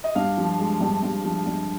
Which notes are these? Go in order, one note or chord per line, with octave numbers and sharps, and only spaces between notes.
D#5
G2 F5
F3
G#3
G2
G2
F3
G2